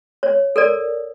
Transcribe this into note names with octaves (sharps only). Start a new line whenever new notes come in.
C#5
A4 A#4 D5